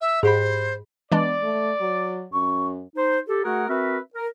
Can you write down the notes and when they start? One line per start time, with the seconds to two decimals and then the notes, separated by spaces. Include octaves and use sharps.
0.01 E5
0.23 G#2 G4 G#4 C5 B5
1.12 E3 G#3 B3 D4 D5
1.43 A3
1.81 F#3
2.33 F#2 C#6
2.95 D#4 C5
3.27 G4 A4
3.44 A3 F#4 G#4 A#4 F#5
3.68 C4 F#4 A#4 B4 E5
4.15 A#4